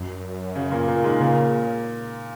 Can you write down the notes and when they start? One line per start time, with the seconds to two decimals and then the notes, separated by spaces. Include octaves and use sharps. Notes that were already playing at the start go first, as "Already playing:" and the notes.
Already playing: F#2
0.56 C#3
0.71 A#2 A#3
0.88 A#2 A#3
1.04 G#2 G#3
1.20 A#2 C#3 A#3